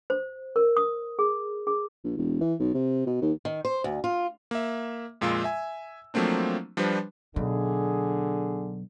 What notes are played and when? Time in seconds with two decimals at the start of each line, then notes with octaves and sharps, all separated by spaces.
0.10 C5
0.56 A#4
0.77 D#6
1.19 G#4
1.67 G#4
2.04 A#1
2.17 E1
2.41 E3
2.59 B1
2.74 C3
3.06 B2
3.22 D#2
3.45 D#3
3.65 C5
3.84 D2
4.04 F4
4.51 A#3 E5
5.21 F2 A#2 G#3 F4 E6
5.44 E5 G#5
6.14 F3 F#3 A3 A#3 C4 D4
6.77 F3 G3 D4 F4 B4 C5
7.36 B1 B2 D3 D4 G#4